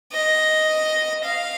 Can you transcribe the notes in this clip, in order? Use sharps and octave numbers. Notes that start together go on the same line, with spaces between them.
D#5
F5